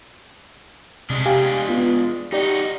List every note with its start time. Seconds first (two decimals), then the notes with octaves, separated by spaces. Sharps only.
1.10 C3 G#3 D4
1.26 G4 F5 G#5
1.69 B3 F4
2.33 D#4 F#4 G4 D5